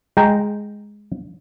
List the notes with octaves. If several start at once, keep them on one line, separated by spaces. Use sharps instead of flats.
G#3 G5 A#5